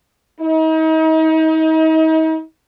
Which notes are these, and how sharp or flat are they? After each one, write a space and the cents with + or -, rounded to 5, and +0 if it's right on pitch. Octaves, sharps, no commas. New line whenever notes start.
D#4 +40